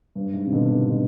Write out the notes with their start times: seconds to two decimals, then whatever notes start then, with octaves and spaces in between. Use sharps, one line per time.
0.15 G2
0.34 G#2
0.46 C3
0.52 B2 D3
0.70 C3 D#3
0.89 B2 D3